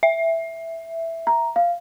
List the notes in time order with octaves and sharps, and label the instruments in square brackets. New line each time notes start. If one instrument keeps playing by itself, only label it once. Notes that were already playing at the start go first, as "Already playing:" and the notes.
[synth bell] E5
[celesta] A#5
F5